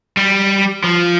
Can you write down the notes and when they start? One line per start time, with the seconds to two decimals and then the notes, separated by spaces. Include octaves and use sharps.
0.17 G3
0.84 F3